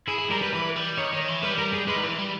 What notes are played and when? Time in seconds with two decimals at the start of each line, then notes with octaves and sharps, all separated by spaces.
0.08 E4 G#4
0.19 G#4
0.31 G3 A#4
0.42 B4
0.53 E3 B4
0.76 G3
0.98 D#3 C#5
1.13 D#3
1.28 E3
1.43 G3 B4
1.58 A#4
1.73 G#4
1.88 G#3 B4
1.97 D#3
2.03 E3
2.18 G3